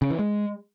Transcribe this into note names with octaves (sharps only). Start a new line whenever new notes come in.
C#3
E3
G#3